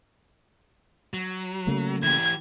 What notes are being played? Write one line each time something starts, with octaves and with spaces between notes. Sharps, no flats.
F#3
C#3 A3 A#3
E3 G4 G#6